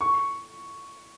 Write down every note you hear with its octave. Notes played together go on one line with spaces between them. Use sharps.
C#6